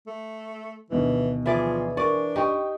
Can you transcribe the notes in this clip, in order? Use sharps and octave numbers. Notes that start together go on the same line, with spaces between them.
A3
D2 B2 D#3 E3
E3 F3 G#4 D5
D4 A#4 D5 C#6
D#4 G4 G5 C#6